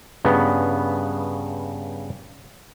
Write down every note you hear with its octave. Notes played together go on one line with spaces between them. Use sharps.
G2 C#3 B3